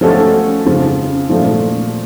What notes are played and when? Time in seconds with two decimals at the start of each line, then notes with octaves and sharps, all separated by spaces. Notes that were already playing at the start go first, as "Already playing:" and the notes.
0.01 F3 A3 C#4 F#4 A4
0.66 F2 C#3 F3
1.29 A#2 F3 A3